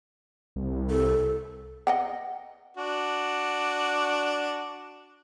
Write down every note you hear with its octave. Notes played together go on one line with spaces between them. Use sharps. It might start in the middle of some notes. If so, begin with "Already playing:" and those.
C2
A4
D#5 F#5 G5
D4 F#4